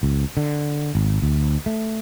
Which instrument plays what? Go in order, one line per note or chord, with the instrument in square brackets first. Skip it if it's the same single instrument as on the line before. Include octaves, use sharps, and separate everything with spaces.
[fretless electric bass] C#2
D3
G#1
D2
A3